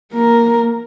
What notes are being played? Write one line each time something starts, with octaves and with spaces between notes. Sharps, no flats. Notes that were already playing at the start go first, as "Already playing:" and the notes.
A#3 A#4